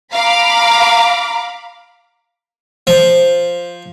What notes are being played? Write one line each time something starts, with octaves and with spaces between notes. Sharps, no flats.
F5 A#5 B5 D6
F3